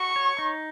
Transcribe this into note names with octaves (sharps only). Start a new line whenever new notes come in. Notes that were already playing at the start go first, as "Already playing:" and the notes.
Already playing: F#4 C#6
C#5
D#4